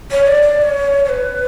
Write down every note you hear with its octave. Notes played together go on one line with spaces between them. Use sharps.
C#5
D5
D5
D5
C#5
C#5
B4